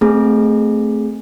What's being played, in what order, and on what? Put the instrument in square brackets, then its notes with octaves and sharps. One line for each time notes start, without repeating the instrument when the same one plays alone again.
[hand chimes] A3 C4 G#4